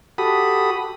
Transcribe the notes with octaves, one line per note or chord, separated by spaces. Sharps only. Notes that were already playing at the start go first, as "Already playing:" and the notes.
F#4 G4 A4 B5 D#6